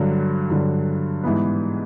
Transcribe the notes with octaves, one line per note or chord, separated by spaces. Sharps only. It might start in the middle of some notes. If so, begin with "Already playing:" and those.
Already playing: G2 D3 F#3
G2 D3 F#3
G#2 E3 G3 B3